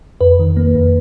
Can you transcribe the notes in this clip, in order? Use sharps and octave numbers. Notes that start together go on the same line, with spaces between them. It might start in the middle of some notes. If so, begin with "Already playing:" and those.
F2 B4
D#3
A#3
F2